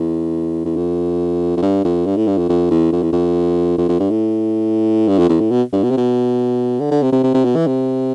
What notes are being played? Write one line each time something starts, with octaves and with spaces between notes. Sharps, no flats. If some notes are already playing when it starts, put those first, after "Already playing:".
Already playing: E2
E2
F2
F2
G2
F2
G2
A2
G2
F2
F2
E2
F2
E2
F2
F2
F2
G2
A2
G2
F2
E2
A2
B2
G2
B2
C3
B2
D3
D3
C3
C3
C3
C3
B2
E3
C3